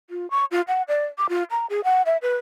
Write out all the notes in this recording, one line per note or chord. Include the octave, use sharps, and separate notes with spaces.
F4
C#6
F4
F#5
D5
D6
F4
A#5
G#4
F#5
E5
B4